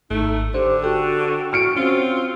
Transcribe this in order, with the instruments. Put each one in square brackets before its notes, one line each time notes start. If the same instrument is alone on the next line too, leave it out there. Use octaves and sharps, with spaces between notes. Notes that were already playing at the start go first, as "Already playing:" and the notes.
[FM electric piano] G#1 [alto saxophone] A3 [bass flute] D#4
[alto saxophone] D3 [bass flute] G4 [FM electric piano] C5
[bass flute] F#4 [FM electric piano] A4 G5 F#6
[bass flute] F#4 [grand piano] F6 C#7 D7
[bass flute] C4 [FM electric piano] C#4 F#4 [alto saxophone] F4